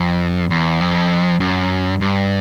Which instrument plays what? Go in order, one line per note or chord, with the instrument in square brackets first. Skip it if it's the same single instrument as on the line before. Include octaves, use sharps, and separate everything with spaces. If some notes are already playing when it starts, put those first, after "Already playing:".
Already playing: [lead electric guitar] F2
E2
F2
F#2
G2